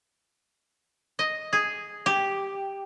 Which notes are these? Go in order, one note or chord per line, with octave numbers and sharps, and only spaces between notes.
D#5
G#4
G4